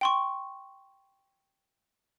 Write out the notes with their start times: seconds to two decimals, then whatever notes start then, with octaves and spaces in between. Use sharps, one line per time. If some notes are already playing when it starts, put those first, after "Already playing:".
0.01 G5 C6 C#6